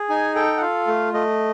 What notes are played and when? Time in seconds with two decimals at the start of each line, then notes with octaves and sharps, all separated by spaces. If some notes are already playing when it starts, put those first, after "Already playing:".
Already playing: G#4
0.09 D#4 G#5
0.35 A4 G5
0.57 F#5
0.61 F4 F5
0.87 A3
1.14 A3 D#5